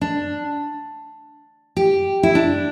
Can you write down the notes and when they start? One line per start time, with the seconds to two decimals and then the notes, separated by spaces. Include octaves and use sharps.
0.01 D4
1.77 G4
2.23 E4
2.35 D4